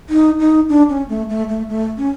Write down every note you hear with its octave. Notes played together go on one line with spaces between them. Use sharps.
D#4
D#4
D4
C#4
A3
A3
A3
A3
C#4